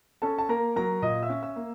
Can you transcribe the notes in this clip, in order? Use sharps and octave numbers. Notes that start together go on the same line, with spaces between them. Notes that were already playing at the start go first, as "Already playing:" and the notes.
C#4 A4 A5
A5
A#3 A#4 A#5
F#3 A#4 A#5
A#2 D#5 D#6
E5 E6
C#4
E5 E6
A#3